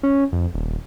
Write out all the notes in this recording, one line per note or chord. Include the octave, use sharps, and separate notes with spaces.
C#4
F2
D#1